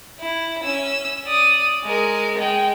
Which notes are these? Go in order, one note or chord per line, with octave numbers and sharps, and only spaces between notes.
E4
C#4 E6
D5 D#6
G#3 A#4
G#3 G5